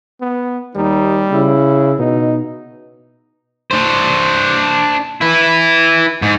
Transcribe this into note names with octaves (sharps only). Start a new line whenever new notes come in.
B3
D#2 G3 D#4
C#3 E4
B2 D#4
D4 C5
E4 B4
G#2